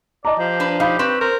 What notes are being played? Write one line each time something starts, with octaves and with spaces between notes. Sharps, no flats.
D5 D#5 A5 A#5
F3 G4
D4 B4
D#4 G4 F5 B5
C4 B4 C#6
A#4 C5